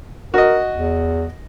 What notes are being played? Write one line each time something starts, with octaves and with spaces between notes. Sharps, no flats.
F#4 A#4 D#5
E2